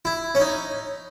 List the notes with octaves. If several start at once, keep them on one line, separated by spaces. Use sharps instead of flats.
E4
C#4
D#4